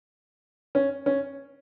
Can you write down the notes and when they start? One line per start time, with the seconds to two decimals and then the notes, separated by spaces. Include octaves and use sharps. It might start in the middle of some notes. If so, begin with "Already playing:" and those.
0.75 C#4
1.06 C#4